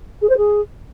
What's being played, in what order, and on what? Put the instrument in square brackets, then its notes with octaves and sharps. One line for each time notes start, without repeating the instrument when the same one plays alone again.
[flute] G#4
C5
G#4